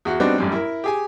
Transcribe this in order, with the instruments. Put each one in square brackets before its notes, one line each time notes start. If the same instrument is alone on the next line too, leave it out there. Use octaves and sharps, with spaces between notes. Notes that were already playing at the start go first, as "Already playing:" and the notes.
[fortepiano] E2 F#4 F#5
G3 B3 C4 D4 D#4 F#4
A1 F#2 G3
E4 A#4
G4 G#4 G#5